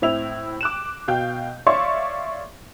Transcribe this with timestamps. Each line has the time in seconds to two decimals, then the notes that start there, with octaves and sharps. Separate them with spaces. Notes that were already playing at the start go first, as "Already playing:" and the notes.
0.02 A2 C4 E4 F7
0.61 D6 F#6 E7
1.08 B2 F5 G5 G6
1.66 C#5 D5 E5 F5 C6 C#6